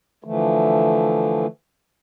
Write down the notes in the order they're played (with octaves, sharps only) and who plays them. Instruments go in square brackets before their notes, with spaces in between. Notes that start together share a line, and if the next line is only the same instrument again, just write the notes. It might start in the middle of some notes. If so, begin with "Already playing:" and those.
[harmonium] D3 E3 F3 A3